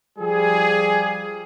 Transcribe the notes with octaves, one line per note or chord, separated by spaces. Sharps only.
F3 G3 G#4